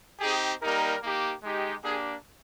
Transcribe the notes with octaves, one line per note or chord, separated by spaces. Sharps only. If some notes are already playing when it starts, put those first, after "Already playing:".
C4 D#4 G4 G#4
G3 A#3 D#4 G4 A#4
A#3 D#4 G4
G#3 D#4 G4
A#3 D4 G4 G#4